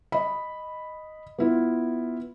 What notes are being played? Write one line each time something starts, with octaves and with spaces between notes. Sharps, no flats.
D#5 B5
B3 E4 F4